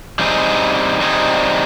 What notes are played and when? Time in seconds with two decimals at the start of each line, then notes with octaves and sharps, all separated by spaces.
0.19 G3 C4 D#4 G#4
1.01 G3 C4 D#4 G#4